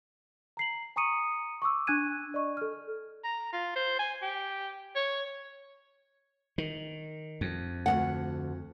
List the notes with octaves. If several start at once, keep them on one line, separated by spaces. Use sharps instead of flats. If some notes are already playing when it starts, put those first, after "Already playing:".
A#5 C7 F#7
G#5 A#5 C#6 D#6 C#7 D#7
C#6 D6 E6
D4 G#5 F#6 G#6 D#7
D5 D#5 C#6
A4 F6
A#5
F4
C5
G#5
G4
C#5
D#3
F2
D2 E3 F#5